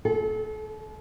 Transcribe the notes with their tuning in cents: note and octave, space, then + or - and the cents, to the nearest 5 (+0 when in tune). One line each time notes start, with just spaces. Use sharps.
A4 -35